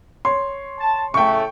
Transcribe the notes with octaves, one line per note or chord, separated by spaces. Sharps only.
C#5 C6
A5
A2 C#3 A3 G5 C#6